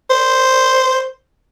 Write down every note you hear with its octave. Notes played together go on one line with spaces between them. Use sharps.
C5